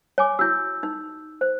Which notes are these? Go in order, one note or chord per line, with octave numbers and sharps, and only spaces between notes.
C#5 G#5 D6
E4 F#4 E6 G6
D#4
C5